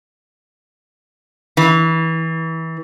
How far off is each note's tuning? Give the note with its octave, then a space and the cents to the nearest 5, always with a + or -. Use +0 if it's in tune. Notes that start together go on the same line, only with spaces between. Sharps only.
E3 -25